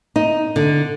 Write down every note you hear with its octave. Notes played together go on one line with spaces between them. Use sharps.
D#4
D3